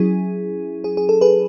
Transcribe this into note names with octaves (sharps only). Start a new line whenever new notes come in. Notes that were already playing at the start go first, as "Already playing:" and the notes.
Already playing: F#3 C#4 E4 G#4
G#4
G#4
A4
G#4 B4